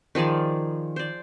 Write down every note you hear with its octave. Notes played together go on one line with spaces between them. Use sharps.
D#3 F3 G#4 D5
C5 D5